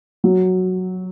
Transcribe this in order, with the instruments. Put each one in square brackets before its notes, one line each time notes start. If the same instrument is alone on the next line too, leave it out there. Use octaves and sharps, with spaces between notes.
[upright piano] F#3